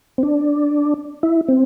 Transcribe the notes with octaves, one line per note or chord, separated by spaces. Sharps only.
C4
D4
E4
C4